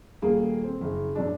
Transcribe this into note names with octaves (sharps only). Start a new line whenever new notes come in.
D#1 A#3 G#4
C4
F#1
F#2 D4